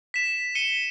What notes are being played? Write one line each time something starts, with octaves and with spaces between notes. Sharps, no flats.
B6 E7
C#7 D#7 G7